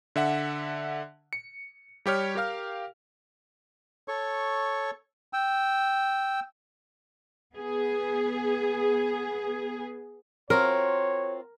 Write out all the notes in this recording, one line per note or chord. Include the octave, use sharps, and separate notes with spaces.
D3 E5 F#5
C#7
G3 G4 C#5 F6
G4 A#4 F5 F6
A4 C#5 C#6
G5 E6
B3 G#4
C4 F4 F#4 A#4 C#5